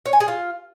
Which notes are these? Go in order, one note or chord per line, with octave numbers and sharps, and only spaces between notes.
C#5
G#5
G#4
F4